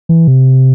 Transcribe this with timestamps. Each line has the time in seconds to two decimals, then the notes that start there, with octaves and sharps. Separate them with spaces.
0.09 E3
0.28 C3